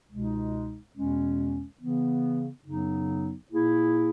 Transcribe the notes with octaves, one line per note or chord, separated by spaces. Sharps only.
C#2 B2 G#3 D#4
E2 B2 G#3 C#4
C#3 E3 B3
F#2 C#3 F#3 B3 D#4
A#2 A#3 E4 G#4